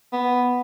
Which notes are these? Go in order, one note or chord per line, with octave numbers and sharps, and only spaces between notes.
B3